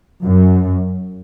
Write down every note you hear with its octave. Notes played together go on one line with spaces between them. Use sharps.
F#2